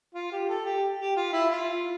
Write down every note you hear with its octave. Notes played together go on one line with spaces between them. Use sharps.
F4
G4
A4
G4
G4
F4
E4
F4